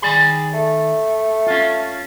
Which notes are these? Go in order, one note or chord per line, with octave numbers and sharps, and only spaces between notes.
D#3 G#4 D5 B5
A3
C#4 F4